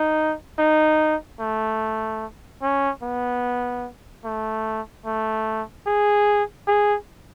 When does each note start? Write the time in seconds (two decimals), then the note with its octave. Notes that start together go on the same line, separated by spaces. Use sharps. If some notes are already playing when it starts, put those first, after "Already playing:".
Already playing: D#4
0.59 D#4
1.40 A3
2.62 C#4
3.03 B3
4.25 A3
5.06 A3
5.87 G#4
6.68 G#4